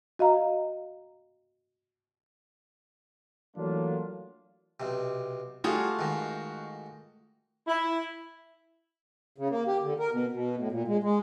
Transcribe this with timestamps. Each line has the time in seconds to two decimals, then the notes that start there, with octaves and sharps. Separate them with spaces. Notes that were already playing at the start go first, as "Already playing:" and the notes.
0.19 F#4 D#5 F5 A#5
3.57 E3 F#3 A3 A#3 D4 F4
4.80 B1 C3
5.64 G3 A3 F4 F#4 G#4 F5
5.99 G#2 D#3
7.68 E4
9.38 C#3
9.50 A#3
9.67 G4
9.83 D3
9.99 A#4
10.12 B2
10.33 B2
10.57 A2
10.72 A#2
10.88 G#3
11.03 G#3